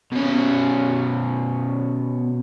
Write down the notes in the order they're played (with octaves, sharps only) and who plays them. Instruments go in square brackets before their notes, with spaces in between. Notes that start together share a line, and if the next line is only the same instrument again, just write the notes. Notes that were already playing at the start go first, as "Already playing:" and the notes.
[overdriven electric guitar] B2 C#4